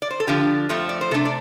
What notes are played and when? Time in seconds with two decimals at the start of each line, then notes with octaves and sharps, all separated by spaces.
0.02 D5
0.10 C5
0.20 A4
0.27 D3 F3 D4 G4
0.69 F2 F3 A3 C4
0.89 D5
1.01 C5
1.11 C3 A4
1.14 A3 D4
1.25 D5